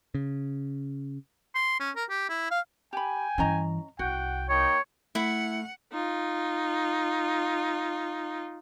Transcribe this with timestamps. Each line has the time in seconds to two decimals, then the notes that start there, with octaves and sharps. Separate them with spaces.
0.15 C#3
1.55 C6
1.80 C#4
1.96 A#4
2.10 G4
2.29 E4
2.51 F5
2.93 G4 G5 G#5 B5
3.38 G2 E3 C#4 D#5 A#5
3.99 C2 F#4 F#5 G5
4.49 A#3 D#4 C#5 G5
5.15 A3 E4 E5 F#5
5.92 D#4 F4